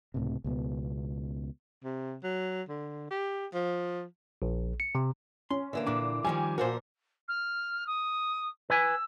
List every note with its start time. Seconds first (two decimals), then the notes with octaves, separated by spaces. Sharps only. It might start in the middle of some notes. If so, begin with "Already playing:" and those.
0.14 C#2 A2 C3
0.44 C#2 B2 B3
1.84 C3
2.23 F#3
2.69 D3
3.11 G4
3.54 F3
4.42 A#1
4.80 C#7
4.95 C3
5.50 C#4 C6
5.73 D3 E3 A#3
5.87 A#2 D4 D6
6.25 D#3 F3 G3 G#5
6.58 A#2 F3 F#4 A#4 C5
7.28 F6
7.87 D#6
8.70 B4 G#5 E6